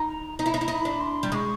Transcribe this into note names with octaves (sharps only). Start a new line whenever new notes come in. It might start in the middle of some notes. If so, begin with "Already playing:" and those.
Already playing: D#4
A#5
D#4 A#5
E4
D#4
E4
D#4 B5
D4
C6
G3
G#3 C#6 D#6